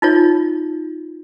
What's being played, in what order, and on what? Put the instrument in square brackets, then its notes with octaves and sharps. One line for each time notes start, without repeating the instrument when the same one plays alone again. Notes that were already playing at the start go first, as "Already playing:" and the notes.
[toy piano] D#4 F4 C#5